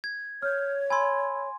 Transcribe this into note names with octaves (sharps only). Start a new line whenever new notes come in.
G#6
C#5 F6 G6
G#5 B5 C6 E6 G#6